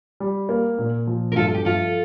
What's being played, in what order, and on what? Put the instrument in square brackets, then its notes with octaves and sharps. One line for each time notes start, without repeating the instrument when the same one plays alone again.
[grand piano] G3
A#3
A#2
F3
[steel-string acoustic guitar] A#4
[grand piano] G2 [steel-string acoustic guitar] F4 A4
[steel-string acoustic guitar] G4
[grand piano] F3 [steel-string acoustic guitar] F4 A4